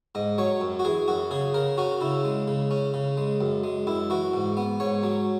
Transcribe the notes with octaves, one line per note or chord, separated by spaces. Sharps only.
G#2 D#5
F#3 C#5
F#2
F#4
E3 G#4
F#2 F#4
C#3 G#4
C#3 A#4
C#4 F#4
C#3 E4
G#3
C#3
C#4
C#3
G#3
F#2
G#3
F#2 E4
E3 F#4
G#2
B3
G#2 C#5
F#3